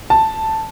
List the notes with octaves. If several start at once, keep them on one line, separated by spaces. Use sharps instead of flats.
A5